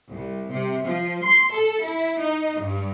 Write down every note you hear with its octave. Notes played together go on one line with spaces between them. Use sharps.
C2
C3
F3
C6
A4
E4
D#4
G2